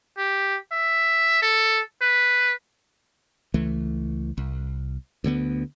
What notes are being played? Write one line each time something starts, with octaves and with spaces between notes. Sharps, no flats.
G4
E5
A4
B4
C#2 E3 A3
C2
D2 D3 A#3 B3